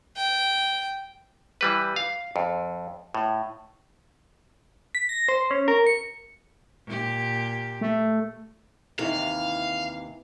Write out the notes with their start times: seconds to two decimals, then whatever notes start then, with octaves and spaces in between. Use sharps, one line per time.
0.16 G5
1.61 E3 G3 B4
1.96 F5
2.36 F2
3.15 A2
4.95 B6
5.09 A#6
5.28 C5
5.51 C#4
5.68 A#4
5.87 C#7
6.85 A#2 G4
7.81 A3
8.99 D#2 C3 E3 F5